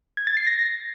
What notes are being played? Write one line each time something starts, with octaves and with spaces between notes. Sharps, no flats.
G#6
A6
C7
A#6